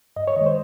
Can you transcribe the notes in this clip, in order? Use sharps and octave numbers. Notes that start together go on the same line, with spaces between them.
G2 D#5
C#5
D#3 G#3 D#5
C5